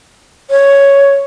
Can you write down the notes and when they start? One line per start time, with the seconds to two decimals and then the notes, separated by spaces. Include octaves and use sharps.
0.50 C#5